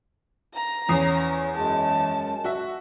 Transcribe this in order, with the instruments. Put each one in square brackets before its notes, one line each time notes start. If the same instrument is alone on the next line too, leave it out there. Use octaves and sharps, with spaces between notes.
[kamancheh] A#5
[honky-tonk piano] E2 D#6 C7 [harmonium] C#4
[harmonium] F#2 G#3 [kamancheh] A5
[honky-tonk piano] F#4 E5